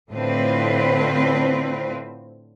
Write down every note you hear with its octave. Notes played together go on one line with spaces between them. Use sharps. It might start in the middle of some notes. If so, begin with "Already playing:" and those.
A2 D3 C4 F4 B4